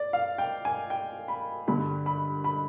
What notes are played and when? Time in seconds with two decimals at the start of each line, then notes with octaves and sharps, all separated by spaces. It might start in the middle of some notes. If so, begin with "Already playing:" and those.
Already playing: D5
0.13 F5
0.38 G5
0.65 G#5
0.90 G5
1.28 B5
1.68 G2 D3 G3 B5
2.06 B5
2.44 B5